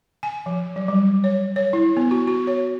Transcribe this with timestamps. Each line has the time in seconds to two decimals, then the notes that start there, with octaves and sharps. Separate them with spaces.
0.23 G#5
0.46 F3
0.76 F#3
0.88 G3
1.24 C#5
1.56 C#5
1.73 E4
1.97 B3
2.11 F#4
2.27 F#4
2.47 C#5